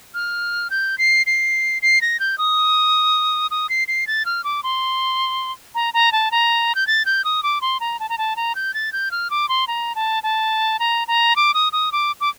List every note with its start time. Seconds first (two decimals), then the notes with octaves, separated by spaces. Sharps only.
0.14 F6
0.70 G6
0.98 C7
1.26 C7
1.82 C7
2.01 A#6
2.20 G6
2.38 D#6
3.51 D#6
3.70 C7
3.88 C7
4.07 A6
4.26 F6
4.44 D6
4.63 C6
5.75 A#5
5.94 A#5
6.12 A5
6.31 A#5
6.75 G6
6.87 A6
7.06 G6
7.25 D#6
7.43 D6
7.61 C6
7.80 A#5
8.00 A5
8.09 A#5
8.18 A5
8.36 A#5
8.55 G6
8.74 A6
8.93 G6
9.11 F6
9.30 D6
9.49 C6
9.68 A#5
9.95 A5
10.23 A5
10.80 A#5
11.08 A#5
11.36 D6
11.54 D#6
11.73 D#6
11.92 D6
12.21 D6